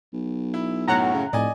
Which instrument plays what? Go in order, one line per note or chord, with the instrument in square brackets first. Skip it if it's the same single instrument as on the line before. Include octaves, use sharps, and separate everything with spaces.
[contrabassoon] B1
[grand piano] E4
[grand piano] F#2 A2 C#4 [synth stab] F#5 A#5
[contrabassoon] C#3
[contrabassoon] F1 [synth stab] A2 [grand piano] D5 D#5 G#5